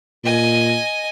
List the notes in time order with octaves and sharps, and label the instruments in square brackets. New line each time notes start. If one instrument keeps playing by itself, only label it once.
[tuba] A#2 [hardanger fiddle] D#5 G#5